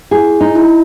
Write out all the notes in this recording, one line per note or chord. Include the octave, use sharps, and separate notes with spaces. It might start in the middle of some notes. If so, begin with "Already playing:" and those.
E4 G#4
D#4
E4